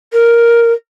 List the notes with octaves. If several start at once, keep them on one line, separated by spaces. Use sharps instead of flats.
A#4